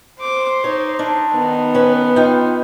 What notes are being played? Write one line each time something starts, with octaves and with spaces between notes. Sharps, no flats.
C5 D6
D#4 C#5
D4 E4
D#3 B3
C#4 B4
D#4 F4 G5